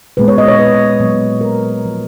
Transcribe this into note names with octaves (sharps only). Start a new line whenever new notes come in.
A#2 G#3 B3 B4
C#5
D#5
C#5
B4
A#2 F#3 B3
A#4
F3 G#3 B3